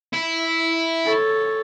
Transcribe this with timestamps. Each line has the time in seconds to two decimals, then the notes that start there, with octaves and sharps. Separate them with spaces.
0.13 E4
1.05 A4 C#5